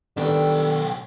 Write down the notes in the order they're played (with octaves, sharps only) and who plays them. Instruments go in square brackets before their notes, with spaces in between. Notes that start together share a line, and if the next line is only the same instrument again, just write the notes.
[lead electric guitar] B1 G5 [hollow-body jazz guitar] D#3 B3 D4 [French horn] G3 [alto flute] A4